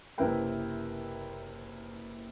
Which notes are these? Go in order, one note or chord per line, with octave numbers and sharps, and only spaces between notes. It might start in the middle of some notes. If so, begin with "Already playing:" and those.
F#1 C3 E4 A#4 B4 G5